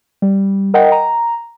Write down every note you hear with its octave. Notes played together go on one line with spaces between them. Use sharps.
G3
A#4 D#5 F#5 G5
A#5